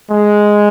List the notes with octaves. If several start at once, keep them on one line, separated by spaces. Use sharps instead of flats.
G#3